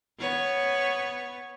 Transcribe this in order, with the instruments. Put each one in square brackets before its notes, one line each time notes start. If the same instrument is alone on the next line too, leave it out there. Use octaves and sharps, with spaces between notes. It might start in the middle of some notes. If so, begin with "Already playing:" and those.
[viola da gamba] B3 C#5